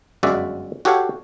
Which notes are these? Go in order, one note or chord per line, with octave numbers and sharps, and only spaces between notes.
G1 F#2 G#3 F#4 D5 E5
F#4 G4 A4 C#5 F5 F#5